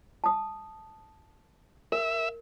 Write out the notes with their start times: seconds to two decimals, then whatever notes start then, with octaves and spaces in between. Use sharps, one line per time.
0.24 A5 D#6
1.92 A#4 E5